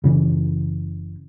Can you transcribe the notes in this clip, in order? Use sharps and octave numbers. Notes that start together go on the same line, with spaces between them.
F#1 C#3 E3